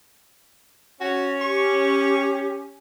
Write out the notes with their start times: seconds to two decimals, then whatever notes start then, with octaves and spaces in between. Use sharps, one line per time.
1.01 C#4 F#4
1.42 G4 C#6